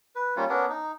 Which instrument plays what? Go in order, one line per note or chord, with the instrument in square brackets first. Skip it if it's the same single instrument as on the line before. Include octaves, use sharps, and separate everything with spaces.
[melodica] B4
G3 A#3 C#4 F4
B3 C#4 D4 A#4
D#4